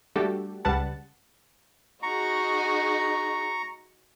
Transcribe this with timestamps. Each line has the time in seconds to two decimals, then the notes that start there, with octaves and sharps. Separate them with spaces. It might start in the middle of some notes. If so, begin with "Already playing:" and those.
0.16 G3 A3 D4 F#4 G4 A4
0.65 C#2 C#3 G3 B4 F#5 A5
2.03 D#4 F#4 G#4 A#5 C#6